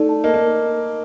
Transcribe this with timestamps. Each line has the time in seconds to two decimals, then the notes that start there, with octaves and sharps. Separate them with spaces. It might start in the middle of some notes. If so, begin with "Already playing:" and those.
Already playing: A3 D#4 A4 D5
0.09 A5
0.24 A#3 D#5
0.34 A#3